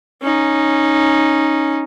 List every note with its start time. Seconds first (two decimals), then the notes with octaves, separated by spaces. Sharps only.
0.22 C#4 D#4